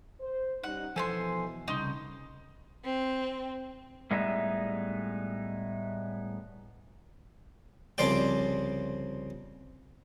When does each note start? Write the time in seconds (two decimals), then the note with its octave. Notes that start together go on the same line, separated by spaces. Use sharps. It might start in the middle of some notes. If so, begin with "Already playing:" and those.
0.20 C5
0.64 G3 C#4 D#4 F#5
0.96 B2 E3 F3 A4 C5 G#5 A5 C6
1.68 C2 C#3 D#4 C6
2.84 C4
4.11 A2 G3 G#3 B3 D#4 E5
7.98 C2 C#3 F3 C5 D5 G5